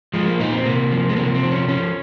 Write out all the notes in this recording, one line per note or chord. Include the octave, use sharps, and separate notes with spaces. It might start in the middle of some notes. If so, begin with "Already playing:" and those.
F3 G#3
A#3
A#2 D#4
C4
C3 A#3
F3
G#3
C3 A#3
C4
F3
C#4
F3 C#4